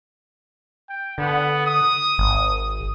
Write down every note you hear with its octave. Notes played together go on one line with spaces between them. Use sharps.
G5
D3 B3
D#6
G#1